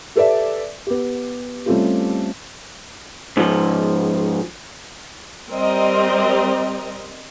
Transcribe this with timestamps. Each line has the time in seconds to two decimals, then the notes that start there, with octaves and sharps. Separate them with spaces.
0.15 G4 A4 B4 D5 E5
0.87 B3 G4
1.66 G3 A3 C4 C#4 F4 G4
3.37 G#2 F3
5.49 G3 C4 A#4 C5 D#5